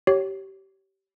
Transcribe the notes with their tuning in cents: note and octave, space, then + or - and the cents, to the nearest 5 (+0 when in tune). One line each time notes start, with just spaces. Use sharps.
G4 -25 C#5 +0